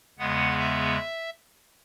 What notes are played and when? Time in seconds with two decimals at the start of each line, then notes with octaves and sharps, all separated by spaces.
0.18 E2 C#3 G#3 B3 F#5
0.59 E5